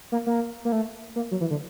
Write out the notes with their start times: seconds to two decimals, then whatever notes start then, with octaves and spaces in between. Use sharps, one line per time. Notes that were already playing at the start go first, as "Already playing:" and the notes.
0.12 A#3
0.27 A#3
0.65 A#3
0.72 A3
1.16 A#3
1.31 F#3
1.41 E3
1.51 D3